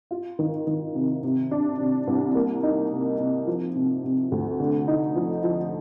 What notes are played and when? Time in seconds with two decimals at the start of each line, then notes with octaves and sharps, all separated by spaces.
0.11 F4
0.39 D#3
0.67 D#3
0.95 C3
1.23 C3
1.51 D4
1.79 C3
2.07 C2
2.35 A#3
2.63 D#4
2.91 C3
3.19 C3
3.47 F3
3.75 C3
4.04 C3
4.32 D2
4.60 D3
4.88 D#4
5.16 F3
5.44 F3